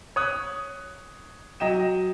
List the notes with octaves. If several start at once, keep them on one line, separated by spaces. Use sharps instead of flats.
C#5 D#6 F#6
F#3 D#5 G5 E7